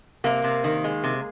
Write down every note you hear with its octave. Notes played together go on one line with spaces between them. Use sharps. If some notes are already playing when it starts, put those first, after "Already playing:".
C3 A#3
C3
D#3
G#3
C3